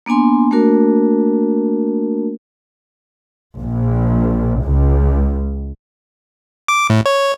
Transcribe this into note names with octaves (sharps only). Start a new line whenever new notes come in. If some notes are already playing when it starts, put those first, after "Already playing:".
A#3 B3 D4 G#5 C6
A3 A#3 D4 F#4 A#4
A#1
C#2
D6
A2
C#5